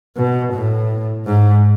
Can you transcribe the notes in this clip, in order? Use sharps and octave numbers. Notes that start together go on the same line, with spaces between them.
B2
A2
G#2